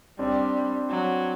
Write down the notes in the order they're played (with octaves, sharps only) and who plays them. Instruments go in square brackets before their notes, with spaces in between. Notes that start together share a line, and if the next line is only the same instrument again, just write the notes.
[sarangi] G3 [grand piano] C4 D4
[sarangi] F#3